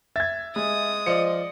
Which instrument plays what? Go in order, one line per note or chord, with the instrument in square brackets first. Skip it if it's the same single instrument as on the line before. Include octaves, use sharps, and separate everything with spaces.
[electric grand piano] E5 [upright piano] G#6 A6
[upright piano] G#3 [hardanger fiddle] D#6
[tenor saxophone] F3 [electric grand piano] D5 D#5 C#7